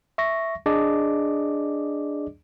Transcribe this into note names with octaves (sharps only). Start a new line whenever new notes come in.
E5 C#6 A#6
D4 G#4 D5 D#5 D6